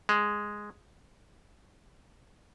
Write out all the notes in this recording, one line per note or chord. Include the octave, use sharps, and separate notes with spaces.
G#3